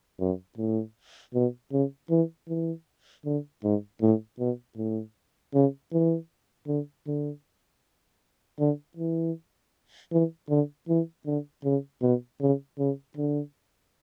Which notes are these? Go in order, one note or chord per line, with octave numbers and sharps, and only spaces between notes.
F#2
A2
B2
C#3
E3
E3
D3
G#2
A2
B2
A2
C#3
E3
D3
D3
D3
E3
E3
D3
E3
D3
C#3
B2
C#3
C#3
D3